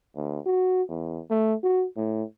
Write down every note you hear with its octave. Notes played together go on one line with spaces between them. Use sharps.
D2
F#4
E2
A3
F#4
A2